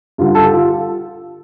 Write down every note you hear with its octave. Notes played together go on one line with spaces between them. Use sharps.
G2 D3 G3 F4
A4
G4
F4